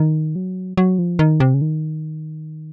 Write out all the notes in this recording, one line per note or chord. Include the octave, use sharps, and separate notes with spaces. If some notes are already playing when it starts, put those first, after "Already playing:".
Already playing: D#3
F#3
F#3
F3
D#3
C3
C#3
D#3